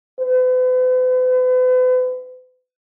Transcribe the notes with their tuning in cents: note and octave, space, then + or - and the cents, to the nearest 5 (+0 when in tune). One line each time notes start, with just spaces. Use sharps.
B4 +45